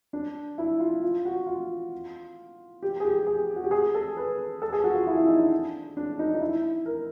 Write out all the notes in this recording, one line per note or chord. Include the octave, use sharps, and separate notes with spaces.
D4
E4
F4
F4
F#4
F4
G4
G#4
G4
G#4
F#4
G4
G#4
A4
B4
A4
G#4
F#4
F4
E4
E4
D#4
D4
D4
D#4
D#4
E4
A#4